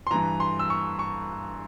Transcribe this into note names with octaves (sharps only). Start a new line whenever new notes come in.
C6
G2 E3 A#5
C6
E6
C#6
C#6